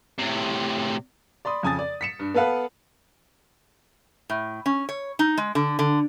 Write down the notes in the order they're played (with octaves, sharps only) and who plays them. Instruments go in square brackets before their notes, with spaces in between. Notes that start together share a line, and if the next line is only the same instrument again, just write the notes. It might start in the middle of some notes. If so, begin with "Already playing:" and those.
[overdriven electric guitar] A2 C3
[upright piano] D5 B5 C6 D#6
F2 C#3 G#5 A5 D#6 A6
D5
B6 C#7 E7
G2
B3 A4 B4 F5 F#5
[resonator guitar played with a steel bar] A2
C#4
C#5
D#4
G#3
D3
D3